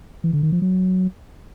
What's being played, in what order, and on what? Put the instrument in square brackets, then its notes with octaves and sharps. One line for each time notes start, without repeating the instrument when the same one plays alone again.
[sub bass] E3
D3
D#3
F3
F#3